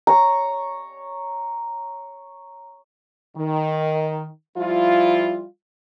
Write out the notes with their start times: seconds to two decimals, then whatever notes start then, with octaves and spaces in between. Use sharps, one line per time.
0.07 C#5 A#5
3.37 D#3
4.57 F3 G3 E4 F4